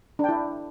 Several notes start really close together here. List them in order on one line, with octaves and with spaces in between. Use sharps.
D4 G5 E4